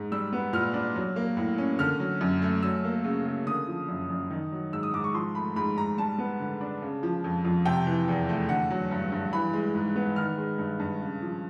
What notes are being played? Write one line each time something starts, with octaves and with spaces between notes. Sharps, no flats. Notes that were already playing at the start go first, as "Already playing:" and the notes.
Already playing: G#2
G3 E6
B3
A#2 F6
D4
F#3
A#3
A2
C#4
D3 F6
F#3
F#2
A3
F#3 E6
A#3
C#3
C#3
D3 D#6
F3
F#2
F#2
D#3
F#3
G#2 E6
D#6
G#2 D6
C#6
F3 C6
A3 B5
G#2 B5
G#2 A#5
G3 A5
B3
D3
D4
C#3
F3
F2
F2
C3 G5
E3
E2
A3
D3 F#5
F#3
G2
G2
E3 B5
G#3
G#2
B3
D#3 F6
G#3
G2
G2
C#3
F3